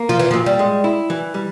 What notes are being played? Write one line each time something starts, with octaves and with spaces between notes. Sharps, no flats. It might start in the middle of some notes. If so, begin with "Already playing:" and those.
Already playing: A#3
F3 F4
E3
F3
A#2
G3
G#3
E4
E3
G3